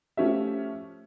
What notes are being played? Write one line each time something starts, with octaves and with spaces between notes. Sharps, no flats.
F3 A3 C#4 G4 E5